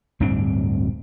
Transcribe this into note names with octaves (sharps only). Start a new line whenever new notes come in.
D1 G2 C4 D4